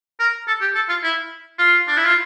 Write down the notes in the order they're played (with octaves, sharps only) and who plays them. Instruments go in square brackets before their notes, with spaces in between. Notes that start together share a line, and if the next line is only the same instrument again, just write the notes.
[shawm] A#4
A4
G4
A4
F4
E4
F4
D4
E4
F4